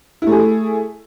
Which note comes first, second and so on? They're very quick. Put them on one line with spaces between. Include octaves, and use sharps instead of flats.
E4 A3 G#4